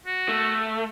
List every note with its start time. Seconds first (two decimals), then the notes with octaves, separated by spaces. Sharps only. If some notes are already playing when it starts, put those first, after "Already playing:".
0.06 F#4
0.29 A3